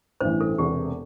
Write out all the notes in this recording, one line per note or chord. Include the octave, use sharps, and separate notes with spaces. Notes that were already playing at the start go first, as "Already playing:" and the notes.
A1 G2 E3 C5
A4
E1 E2 C3 E3 G4